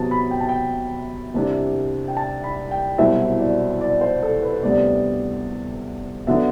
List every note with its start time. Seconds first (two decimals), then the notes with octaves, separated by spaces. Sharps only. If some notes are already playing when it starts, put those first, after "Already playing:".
Already playing: C3 F#3 B3 A5
0.11 B5
0.31 G5
0.41 A5
0.49 G5
1.34 C2 C3 G3 D4
2.08 G5
2.17 A5
2.44 B5
2.71 G5
2.98 C2 B2 F#3 C4 E4 E5
3.39 D5
3.81 D5
4.01 C5
4.22 A4
4.43 B4
4.63 D2 C3 G3 B3 D5
6.27 D3 F#3 B3 E5